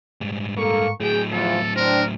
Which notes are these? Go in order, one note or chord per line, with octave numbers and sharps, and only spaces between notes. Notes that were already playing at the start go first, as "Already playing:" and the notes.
G#2 G3
A#3 A4 C#6
A2 F#3 G#4 G5
E2 F3 A4
C4 D4 A#4